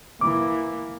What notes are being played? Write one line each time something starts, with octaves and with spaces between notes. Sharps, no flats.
E3 A#3 D6